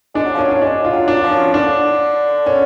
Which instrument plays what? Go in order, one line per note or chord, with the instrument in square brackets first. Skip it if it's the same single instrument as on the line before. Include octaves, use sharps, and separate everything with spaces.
[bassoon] G#3 [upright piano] D4
[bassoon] F#3
[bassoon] F3 [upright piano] C#4
[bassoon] F#3
[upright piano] C#4
[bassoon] G#3 [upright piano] D4
[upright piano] F4
[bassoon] F#3
[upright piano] D4
[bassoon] F3
[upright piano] C#4
[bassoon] D3 [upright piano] D4
[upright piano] C#4